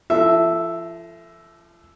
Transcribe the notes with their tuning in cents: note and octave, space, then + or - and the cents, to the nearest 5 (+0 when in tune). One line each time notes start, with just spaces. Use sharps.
F3 -40 A4 +0 E5 +0